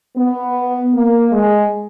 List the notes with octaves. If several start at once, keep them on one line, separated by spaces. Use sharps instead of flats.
B3
A#3
G#3